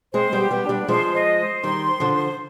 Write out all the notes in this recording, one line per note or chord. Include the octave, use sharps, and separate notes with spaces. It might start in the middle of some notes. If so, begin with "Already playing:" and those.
G#3 C4 C5
G3 B3
G4
G3 B3
D4
G3 B3
F3 G#3 C5
D#5
C5
D#3 G3 C6
C5
D3 F3
C5